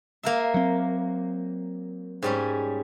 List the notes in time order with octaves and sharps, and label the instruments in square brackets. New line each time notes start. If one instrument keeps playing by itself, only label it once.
[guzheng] A#3 A#4 E5
[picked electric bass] F#3 C4
[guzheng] G#2 G3 C#4